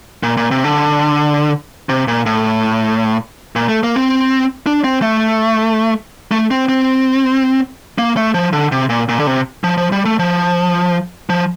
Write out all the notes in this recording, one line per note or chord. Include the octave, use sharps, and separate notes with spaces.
A#2
A#2
C3
D3
C3
A#2
A2
A#2
A3
A#3
C4
D4
C4
A3
A3
C4
C4
A#3
A3
F3
D3
C3
A#2
A#2
D3
C3
F3
F3
G3
A3
F3
F3